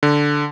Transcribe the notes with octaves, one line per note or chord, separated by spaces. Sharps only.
D3